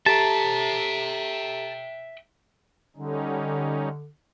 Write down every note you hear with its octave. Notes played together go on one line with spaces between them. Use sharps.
G4 A4 E5 G5 A5 A#5
D3 G3 C#4 D#4